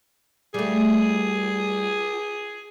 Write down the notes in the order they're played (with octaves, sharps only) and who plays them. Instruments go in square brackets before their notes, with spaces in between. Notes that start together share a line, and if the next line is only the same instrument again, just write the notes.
[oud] G3 A3 [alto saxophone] G#4